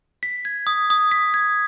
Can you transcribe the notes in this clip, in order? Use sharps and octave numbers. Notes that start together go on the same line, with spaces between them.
B6
G#6
D#6
D#6
B6
G#6